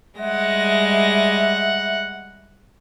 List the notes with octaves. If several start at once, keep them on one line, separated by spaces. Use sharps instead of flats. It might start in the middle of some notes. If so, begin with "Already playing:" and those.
G3 G#3 E5 F#5 A#6